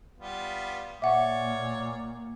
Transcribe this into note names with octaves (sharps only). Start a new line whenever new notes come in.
G3 B3 F4
A#2 A#3 C#5 D5 E5 F#5 C#6